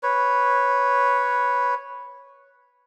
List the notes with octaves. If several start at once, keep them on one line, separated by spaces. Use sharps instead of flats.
B4 C#5